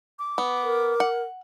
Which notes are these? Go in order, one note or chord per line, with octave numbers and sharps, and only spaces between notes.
D6
B3
A#4
F#5